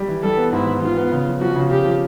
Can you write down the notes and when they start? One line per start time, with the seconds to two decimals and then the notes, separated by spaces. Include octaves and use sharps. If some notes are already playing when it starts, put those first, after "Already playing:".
Already playing: G3 G4
0.08 E3
0.23 G3 A4
0.37 B3
0.52 G#2 E4
0.67 E3
0.82 E3 F4
0.97 B3
1.12 C#3
1.27 F3
1.41 F3 F#4
1.56 C#3
1.71 C#3 G4
1.85 F3